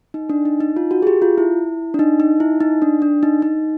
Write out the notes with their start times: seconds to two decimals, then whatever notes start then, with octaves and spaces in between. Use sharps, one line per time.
0.14 D#4
0.30 D4
0.45 D#4
0.61 D#4
0.76 F4
0.91 F#4
1.02 G#4
1.07 G4
1.22 F4
1.38 E4
1.94 D4
1.99 D#4
2.20 D#4
2.40 E4
2.60 D#4
2.82 D4
3.02 D4
3.23 D#4
3.42 D#4